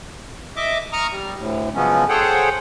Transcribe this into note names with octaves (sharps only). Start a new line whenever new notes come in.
D#5 E5 D6
A#5 C#6 D#6 F6
G3
D2 A2
C#3 F3 F#3 G#3 B3 C#4
G#4 A4 C5 C#5 F#5 G5